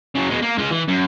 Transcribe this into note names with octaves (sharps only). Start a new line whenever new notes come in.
C#3 F#3
B2 G#3
A#3
G#3 F4
E3
F#2